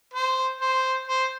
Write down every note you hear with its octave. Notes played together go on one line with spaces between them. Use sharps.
C5
C5
C5